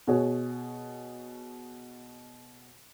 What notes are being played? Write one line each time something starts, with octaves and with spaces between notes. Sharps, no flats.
B2 F#4 G#4 C#5